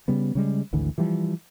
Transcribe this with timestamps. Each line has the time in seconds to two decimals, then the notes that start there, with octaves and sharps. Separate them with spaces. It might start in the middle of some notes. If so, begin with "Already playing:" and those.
0.08 C#3 G3 B3
0.35 C#3 G3 G#3
0.73 G#1 D2 D3 E3
0.98 E3 F3 G3